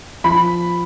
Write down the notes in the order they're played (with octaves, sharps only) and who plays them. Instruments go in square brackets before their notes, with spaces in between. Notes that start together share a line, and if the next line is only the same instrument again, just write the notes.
[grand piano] F3 B5